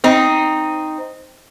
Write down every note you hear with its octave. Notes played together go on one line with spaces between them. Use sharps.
C4 D#4